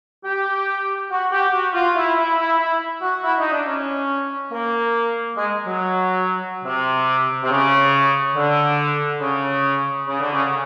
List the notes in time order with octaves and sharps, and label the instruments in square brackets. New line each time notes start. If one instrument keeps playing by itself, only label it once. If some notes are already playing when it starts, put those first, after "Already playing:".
[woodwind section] G4
F#4
G4
F#4
F4
E4
E4
E4
E4
F#4
E4
D#4
D4
C#4
A#3
G#3
F#3
C3
C3
C#3
D3
C#3
C#3
D3
C#3
C#3